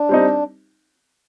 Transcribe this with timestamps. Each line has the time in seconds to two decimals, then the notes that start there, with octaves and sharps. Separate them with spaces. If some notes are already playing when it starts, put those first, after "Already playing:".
Already playing: D4
0.09 G3 C4 D#4